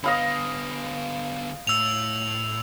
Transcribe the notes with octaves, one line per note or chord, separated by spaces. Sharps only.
D3 B3 D#5 F5 B5
A2 E6 F7